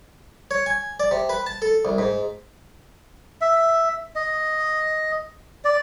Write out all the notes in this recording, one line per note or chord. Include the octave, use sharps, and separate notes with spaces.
C#5
G#5
D5
C3
B4
A5
A4
C2
G#2
E5
D#5
D5